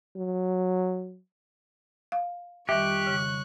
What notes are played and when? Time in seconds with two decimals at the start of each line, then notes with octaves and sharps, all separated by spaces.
0.16 F#3
2.12 F5
2.69 F2 D#3 G3 G4 E5 C#6 F#6
3.07 C#3